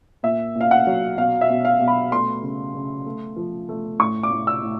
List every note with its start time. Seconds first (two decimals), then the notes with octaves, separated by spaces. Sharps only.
0.23 A#2 E5
0.55 A#2
0.61 F5
0.71 F#5
0.87 F#3
1.17 B2 F5
1.41 E5
1.50 B2
1.65 F5
1.80 B2
1.88 B5
2.12 A3 C6
2.42 C#3
2.74 C#3
3.06 A3
3.36 F3
3.69 A3
3.99 A2 C#6
4.23 D6
4.31 A2
4.47 E6
4.62 A2